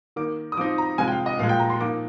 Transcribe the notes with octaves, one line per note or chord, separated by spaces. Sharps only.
D#3 A#3 D#4 D6
D#6
F3 C4 D#4 D6
A#5
C3 F3 G#3 G#5
G5
F5
D#5
A#2 F3 G#3 F5
G5
A#5
C6
F3 A#3 D#4 D6